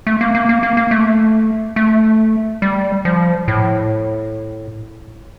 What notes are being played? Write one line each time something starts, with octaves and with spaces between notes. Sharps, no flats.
A3
A#3
A#3
A#3
A#3
A#3
A3
A3
G3
F3
A2